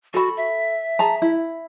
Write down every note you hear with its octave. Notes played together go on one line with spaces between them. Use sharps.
F#4 A4 B5
E5
G#4 A5 A#5
E4